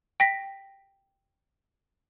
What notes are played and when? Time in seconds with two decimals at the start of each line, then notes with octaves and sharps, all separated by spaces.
0.20 G5 A#6 B6